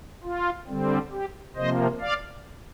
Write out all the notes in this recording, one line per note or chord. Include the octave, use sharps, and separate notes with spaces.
F4
D3 G3 C4
G4
C3 F3 A#3 C5 D#5
D5 F5